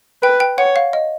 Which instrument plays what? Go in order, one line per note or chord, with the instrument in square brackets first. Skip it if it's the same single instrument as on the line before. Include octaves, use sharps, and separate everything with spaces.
[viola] B4 [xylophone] G5
[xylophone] G5
[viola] C#5 [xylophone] F#5
[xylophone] F5
D#5